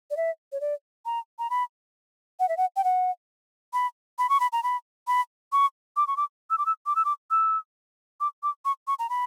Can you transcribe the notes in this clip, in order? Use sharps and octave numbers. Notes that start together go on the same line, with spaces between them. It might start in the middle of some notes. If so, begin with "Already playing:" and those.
D5
E5
C#5
D5
A#5
A#5
B5
F#5
E5
F#5
G5
F#5
B5
B5
C#6
B5
A#5
B5
B5
C#6
D6
C#6
D6
E6
D6
E6
D6
E6
D6
E6
D6
D6
C#6
C#6
A#5
B5